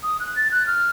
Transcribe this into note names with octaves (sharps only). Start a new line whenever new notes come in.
D#6
F#6
A6
F#6
F6